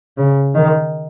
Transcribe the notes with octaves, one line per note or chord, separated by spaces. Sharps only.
C#3
D#3